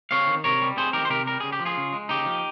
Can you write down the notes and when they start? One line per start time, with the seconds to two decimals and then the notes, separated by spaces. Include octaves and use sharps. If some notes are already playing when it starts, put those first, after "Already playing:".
0.11 C4 C#5 F5
0.27 D#3
0.44 C3 A#4 C#5
0.61 G3
0.77 C4 G#4 C5
0.93 D#3 G4 A#4
1.05 C5
1.10 C3 G4 A#4
1.27 G3 A#4
1.40 C#3 G#4
1.52 G4
1.59 F3
1.65 F4 G#4
1.77 C#3
1.93 G#3
2.09 C#3 D#4 G4
2.26 F3